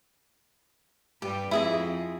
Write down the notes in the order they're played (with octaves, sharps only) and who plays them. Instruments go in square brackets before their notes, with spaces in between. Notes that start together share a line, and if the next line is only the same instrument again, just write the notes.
[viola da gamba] G2 G3 B4 [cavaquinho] G4
[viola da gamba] F2 C4 [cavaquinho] E4 G#4 D#5